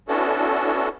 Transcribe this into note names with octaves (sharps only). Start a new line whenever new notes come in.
B3 C#4 D4 E4 F#4 A4